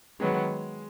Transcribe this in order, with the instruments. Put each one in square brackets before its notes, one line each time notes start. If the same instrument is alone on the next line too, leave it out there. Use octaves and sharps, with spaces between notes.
[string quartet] D#3 F#3 B3 [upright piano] G#3